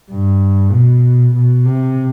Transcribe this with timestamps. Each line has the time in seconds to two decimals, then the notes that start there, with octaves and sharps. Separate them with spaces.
0.11 G2
0.72 B2
1.35 B2
1.66 C3